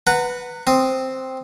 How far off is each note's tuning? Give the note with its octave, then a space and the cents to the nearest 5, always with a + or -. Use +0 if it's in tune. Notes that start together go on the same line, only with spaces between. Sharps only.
B4 +0 F#5 +0 A#5 -30
C4 +0 D#6 +0